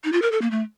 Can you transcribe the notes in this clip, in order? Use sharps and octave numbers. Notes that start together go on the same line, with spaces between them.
D#4
F4
A#4
A4
A#3
A3